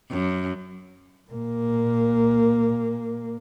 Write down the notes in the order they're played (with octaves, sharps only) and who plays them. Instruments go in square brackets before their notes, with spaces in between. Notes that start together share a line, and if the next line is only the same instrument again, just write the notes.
[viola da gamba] F#2
[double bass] A#2 A#3